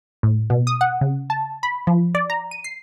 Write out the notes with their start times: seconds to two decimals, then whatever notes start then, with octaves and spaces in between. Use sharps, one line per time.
0.23 A2
0.50 B2
0.67 D#6
0.81 F#5
1.01 C#3
1.30 A5
1.63 B5
1.87 F3
2.15 D5
2.30 A#5
2.51 D#7
2.64 C7